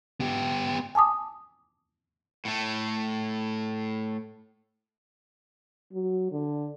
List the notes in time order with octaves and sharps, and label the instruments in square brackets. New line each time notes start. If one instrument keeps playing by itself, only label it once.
[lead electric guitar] B3 G4
[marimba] G#5 A5 D6 D#6
[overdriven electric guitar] A2 A3
[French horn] F#3
D3